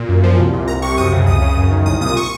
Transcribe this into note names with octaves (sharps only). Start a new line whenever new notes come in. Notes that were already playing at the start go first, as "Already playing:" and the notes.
Already playing: A#2
F#2
F3
C2
A#2
C2 A#5
C3 C#6
F#2 D#6
C#3
C#2 D#6
C#3
F#2
D#3
C2 D#6
A#2 D#6
C#6